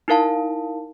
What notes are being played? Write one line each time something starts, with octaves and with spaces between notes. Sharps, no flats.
D#4 E4 A#4 F5 A5